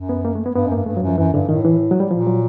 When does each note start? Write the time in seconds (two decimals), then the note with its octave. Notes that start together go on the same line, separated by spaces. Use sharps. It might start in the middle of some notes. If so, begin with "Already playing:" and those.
Already playing: F#2
0.09 B3
0.25 A#3
0.35 A3
0.46 B3
0.56 G2 B3
0.67 F#2
0.72 G2 A#3
0.86 G2 A3
0.97 F#3
1.03 F#2 F3
1.18 F#2 E3
1.34 G2 D3
1.49 A2 D#3
1.65 E3
1.91 F#3
2.00 G3
2.11 A#2 F3
2.27 F#3